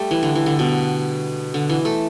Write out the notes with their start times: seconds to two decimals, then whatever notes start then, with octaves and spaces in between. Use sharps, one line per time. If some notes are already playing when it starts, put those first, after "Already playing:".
Already playing: G3 A3
0.11 E3
0.23 D3
0.35 E3
0.46 D3
0.59 B2
1.54 D3
1.69 E3
1.85 A3